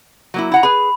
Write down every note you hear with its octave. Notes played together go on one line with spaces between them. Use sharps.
F#3 A#3 E4
E4 F#5 A#5
G#4 B4 B5